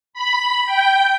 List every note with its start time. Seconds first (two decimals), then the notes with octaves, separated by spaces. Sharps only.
0.14 B5
0.66 G5